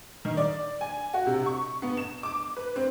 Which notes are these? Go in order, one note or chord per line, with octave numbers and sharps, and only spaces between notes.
D#3
D5
G#5
F#4
C3
C#6
B3
E7
D6
B4
C4